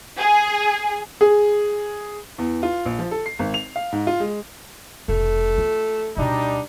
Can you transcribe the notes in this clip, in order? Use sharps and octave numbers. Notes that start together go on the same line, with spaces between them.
G#4
G#4
E2
F4
A#1
F3
A4
C7
G#1
F7
F5
G#2
F4
G#3
F1 B2 A3
F4
D2 B2 G3 D4 D#4